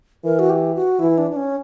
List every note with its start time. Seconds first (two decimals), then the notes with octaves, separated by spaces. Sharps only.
0.24 E3 A#4
0.39 F#4
0.49 G4
0.75 F#4
0.99 E3 E4
1.18 D4
1.31 D4
1.36 C#4